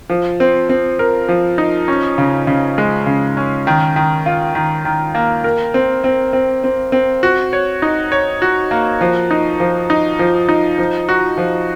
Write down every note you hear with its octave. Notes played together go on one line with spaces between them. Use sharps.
F3
C4
C4
A#4
F3
D#4
C#4
C#3
C#3
G#3
C#3
C#4
D#3
D#3
F4
D#3
D#3
A#3
A#4
C4
C4
C4
C4
C4
F#4
C#5
D#4
C#5
F#4
A#3
F3
D#4
F3
D#4
F3
D#4
F3
F#4
F3